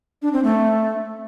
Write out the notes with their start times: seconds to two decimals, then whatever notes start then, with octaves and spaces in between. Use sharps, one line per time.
0.22 D4
0.33 C4
0.43 A3